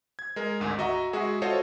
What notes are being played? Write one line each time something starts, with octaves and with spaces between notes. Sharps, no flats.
G#6
G#3 A#4
G#1 D2 G#2
F#4 D#5 E5 A#5
G#3 F#4 G#4 E5
F4 F#4 A4 C5 C#5 D#5